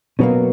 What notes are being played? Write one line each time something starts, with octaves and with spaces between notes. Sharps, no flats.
B2 F#3 A#3 B3